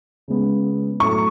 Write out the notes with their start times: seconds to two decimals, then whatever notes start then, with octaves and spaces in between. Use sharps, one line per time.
0.28 C#3 G#3 B3
0.99 A2 F#3 A3 C#6